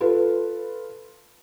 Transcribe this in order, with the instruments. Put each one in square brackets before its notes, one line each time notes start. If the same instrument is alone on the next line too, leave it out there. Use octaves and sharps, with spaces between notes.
[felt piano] F4 A4 B4